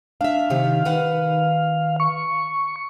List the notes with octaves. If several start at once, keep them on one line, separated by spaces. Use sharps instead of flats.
D4 E5 F5
C3 D#3 G4
D#3 B4 F#5
C#6